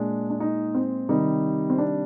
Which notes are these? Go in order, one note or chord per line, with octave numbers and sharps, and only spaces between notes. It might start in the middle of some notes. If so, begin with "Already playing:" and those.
Already playing: A#2 G#3 D4
D4
D#4
C4
C3 D#3 G3 D#4
C4
D4